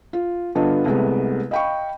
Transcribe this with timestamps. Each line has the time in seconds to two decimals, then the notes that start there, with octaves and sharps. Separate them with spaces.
0.13 F4
0.55 G2 D3 B3 F4 D#5
0.86 C2 C3 G#3 A3 B3
1.51 D#5 F5 G5 B5 C#6